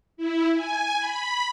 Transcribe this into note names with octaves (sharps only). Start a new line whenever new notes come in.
E4
G#5
B5